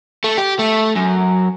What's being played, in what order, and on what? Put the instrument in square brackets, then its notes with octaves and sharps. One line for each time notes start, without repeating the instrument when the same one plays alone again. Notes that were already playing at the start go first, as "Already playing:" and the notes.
[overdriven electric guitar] A3
G4
A3
F#2